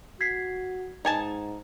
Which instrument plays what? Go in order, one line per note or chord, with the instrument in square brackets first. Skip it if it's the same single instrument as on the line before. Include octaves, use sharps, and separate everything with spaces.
[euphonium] F#4 [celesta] G#6 B6 C7
[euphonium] G#2 [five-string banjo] D#4 G#5 A5